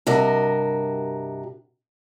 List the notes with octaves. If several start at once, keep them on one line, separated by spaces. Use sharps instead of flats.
G2 C3 F#4 A#4 D#5